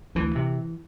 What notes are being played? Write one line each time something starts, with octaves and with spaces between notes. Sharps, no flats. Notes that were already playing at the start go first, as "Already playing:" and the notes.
D2 E3
C3